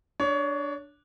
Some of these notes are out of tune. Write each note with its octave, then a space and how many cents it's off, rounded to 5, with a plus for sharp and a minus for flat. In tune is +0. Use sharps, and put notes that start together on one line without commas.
D4 +0 C#5 +25